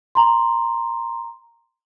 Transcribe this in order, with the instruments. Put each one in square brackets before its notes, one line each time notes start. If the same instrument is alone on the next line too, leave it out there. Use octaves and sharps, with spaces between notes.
[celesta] A#5 C6